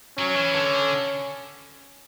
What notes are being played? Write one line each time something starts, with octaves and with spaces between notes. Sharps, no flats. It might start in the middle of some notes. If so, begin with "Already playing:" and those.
F#3 C#4
E3
D3